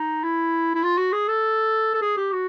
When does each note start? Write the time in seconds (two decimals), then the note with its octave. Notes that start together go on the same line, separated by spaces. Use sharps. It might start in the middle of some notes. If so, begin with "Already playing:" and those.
Already playing: D#4
0.24 E4
0.75 E4
0.84 F4
0.98 F#4
1.13 G#4
1.28 A4
1.94 A4
2.02 G#4
2.17 G4
2.32 F#4